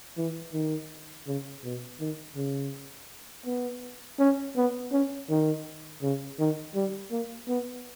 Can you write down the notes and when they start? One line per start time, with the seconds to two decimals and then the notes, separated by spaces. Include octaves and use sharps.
0.18 E3
0.53 D#3
1.27 C#3
1.64 B2
2.00 D#3
2.36 C#3
3.46 B3
4.19 C#4
4.57 B3
4.92 C#4
5.30 D#3
6.02 C#3
6.40 D#3
6.75 G3
7.12 A#3
7.49 B3